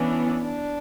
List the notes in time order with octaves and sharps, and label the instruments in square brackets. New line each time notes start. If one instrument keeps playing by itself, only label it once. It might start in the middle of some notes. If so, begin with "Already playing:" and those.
Already playing: [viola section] E3 B3 D4 [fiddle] C#4
[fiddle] D4